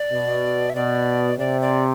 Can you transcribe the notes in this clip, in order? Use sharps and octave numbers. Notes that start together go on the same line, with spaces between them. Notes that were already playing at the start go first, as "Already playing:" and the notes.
Already playing: D5
B2
E5
B2 D5
C3 D5
D5